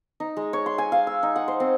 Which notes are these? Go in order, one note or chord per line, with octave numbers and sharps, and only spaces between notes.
D#4
G#3
C#5
C6
G#5
F5
E6
D#4
F#5
C5
C4